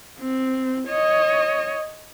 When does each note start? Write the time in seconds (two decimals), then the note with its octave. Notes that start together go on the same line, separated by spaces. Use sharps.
0.19 C4
0.87 C#5 D#5